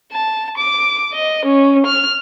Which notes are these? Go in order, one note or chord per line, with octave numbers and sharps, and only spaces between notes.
A5
D6
D#5
C#4
F6